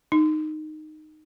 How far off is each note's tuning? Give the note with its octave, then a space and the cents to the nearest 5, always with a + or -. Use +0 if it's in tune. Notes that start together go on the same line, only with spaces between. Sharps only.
D#4 -10